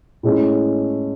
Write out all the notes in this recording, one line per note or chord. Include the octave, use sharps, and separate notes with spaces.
A2 G#3 C#4